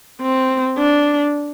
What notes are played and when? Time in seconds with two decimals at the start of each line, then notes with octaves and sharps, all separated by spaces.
0.22 C4
0.79 D4